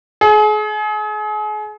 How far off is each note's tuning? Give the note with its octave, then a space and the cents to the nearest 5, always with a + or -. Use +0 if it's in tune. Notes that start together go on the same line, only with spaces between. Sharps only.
G#4 +35